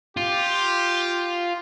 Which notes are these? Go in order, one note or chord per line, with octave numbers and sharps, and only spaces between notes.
F4 G4